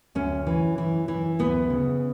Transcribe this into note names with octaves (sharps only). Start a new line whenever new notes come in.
D2 C#4
E3
E3
E3
D2 B3
C#3